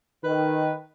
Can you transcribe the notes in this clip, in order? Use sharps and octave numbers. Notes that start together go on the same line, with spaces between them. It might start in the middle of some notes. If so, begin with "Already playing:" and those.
D#3 B4